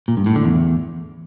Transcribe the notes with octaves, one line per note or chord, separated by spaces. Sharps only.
A#2
G2
A2
D3
E2